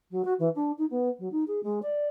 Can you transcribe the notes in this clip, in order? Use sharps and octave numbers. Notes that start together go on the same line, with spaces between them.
F#3
F#4
E3
D4
D#4
B3
F#3
D#4
G#4
G#3
D5